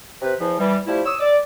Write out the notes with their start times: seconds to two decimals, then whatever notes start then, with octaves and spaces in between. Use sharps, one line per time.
0.21 C3 B4
0.39 E2 E3 F3
0.59 E3 G3
0.86 F3 G3 A3 E4
1.05 C#5 D#6 E6
1.20 D5